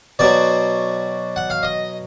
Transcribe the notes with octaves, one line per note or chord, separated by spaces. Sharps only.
B2 F#3 D5
F#5
F5
D#5